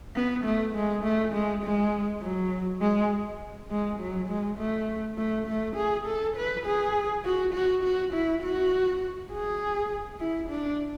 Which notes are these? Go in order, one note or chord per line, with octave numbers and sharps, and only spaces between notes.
B3
A3
G#3
A3
G#3
G#3
F#3
G#3
G#3
F#3
G#3
A3
A3
A3
G#4
A4
B4
G#4
F#4
F#4
F#4
E4
F#4
G#4
E4
D4